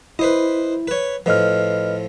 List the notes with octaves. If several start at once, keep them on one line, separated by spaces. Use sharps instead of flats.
E4 B4 C5 D#5
B4 C#5
A2 F3 B4 D#5 F6